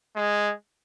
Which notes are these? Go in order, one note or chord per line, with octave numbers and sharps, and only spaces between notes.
G#3